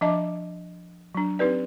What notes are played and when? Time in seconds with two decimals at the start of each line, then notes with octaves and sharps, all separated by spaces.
0.01 F3 D4 D#5 E5 A5 D6
1.15 F#3 D4
1.39 C4 D#4 G4 B4 D5